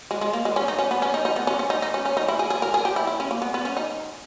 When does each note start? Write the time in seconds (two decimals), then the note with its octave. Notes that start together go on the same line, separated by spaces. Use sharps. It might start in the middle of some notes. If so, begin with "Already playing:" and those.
0.11 G#3
0.21 G#3
0.33 A#3
0.45 G#3
0.56 C#4
0.68 D#4
0.79 C#4
0.91 B3
1.02 C#4
1.14 D#4
1.25 D#4
1.36 B3
1.47 C#4
1.59 C#4
1.70 D#4
1.82 D#4
1.94 C#4
2.05 C#4
2.17 D#4
2.28 E4
2.39 G#4
2.50 G#4
2.62 A#4
2.74 G#4
2.85 G4
2.96 E4
3.07 E4
3.20 C#4
3.31 A#3
3.42 B3
3.54 B3
3.65 C#4
3.77 D#4